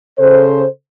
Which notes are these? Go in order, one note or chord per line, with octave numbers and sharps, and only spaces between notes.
C#3 A4 C5